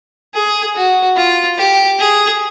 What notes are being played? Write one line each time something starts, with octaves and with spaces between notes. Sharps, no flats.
G#4
F#4
F4
G4
G#4